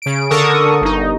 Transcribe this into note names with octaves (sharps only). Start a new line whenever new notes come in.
C#3 D7
D3 A4 A#4 C#6 D#6
G1 D#4